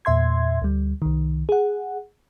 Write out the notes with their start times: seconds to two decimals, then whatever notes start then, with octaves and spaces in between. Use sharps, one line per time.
0.05 E2 A#2 E5 C6 G#6
0.62 D2 G3
1.02 C2 D#3
1.49 G#4 F#5